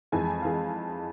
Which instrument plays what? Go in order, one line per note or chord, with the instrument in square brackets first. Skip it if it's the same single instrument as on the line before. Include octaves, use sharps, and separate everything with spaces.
[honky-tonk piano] F2 E3 G#3 G#5
E3 G#3 F5